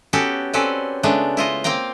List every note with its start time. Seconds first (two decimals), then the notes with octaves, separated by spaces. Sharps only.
0.13 B3 C#4 F#4 G4 A4
0.53 C4 C#4 A4 B4 D5
1.03 C#3 G#3 A3 B3 D4
1.37 E4 F4 D#5
1.64 A#3 C4 F5 G5 A#5